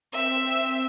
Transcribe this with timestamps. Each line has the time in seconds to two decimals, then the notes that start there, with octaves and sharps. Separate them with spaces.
0.13 C4 E5
0.46 C4